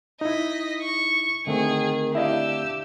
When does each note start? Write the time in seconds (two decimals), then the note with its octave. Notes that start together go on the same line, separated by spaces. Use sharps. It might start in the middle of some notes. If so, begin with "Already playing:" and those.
0.21 D#4 E4 D#5 B6
0.82 C#6
1.47 D3 D#3 A3 C4 G#4
2.15 D4 E4 G4 D#5 F5 E6